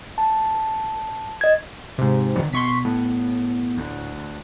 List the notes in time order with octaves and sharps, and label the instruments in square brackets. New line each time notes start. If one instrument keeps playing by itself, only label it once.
[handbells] A5
[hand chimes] D#5 G#6
[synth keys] G#2 C3
[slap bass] D3 D#3 F#3
[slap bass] B2 [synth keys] C6 C#6 B6
[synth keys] A2 [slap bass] B3
[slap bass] D2